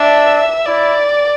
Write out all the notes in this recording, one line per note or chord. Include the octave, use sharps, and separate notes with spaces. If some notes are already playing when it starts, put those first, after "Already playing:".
Already playing: D4 E5
E4 D5